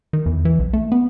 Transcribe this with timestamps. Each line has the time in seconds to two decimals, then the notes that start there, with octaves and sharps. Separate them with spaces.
0.13 D#3
0.26 E2
0.45 E3
0.59 B1
0.73 A3
0.92 B3